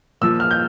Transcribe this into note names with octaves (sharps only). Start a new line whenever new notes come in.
A#2 F3 E6
F6
G6